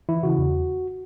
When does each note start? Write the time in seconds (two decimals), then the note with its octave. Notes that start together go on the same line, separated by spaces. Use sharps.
0.09 E3 E4
0.23 C#3 F#4
0.38 E2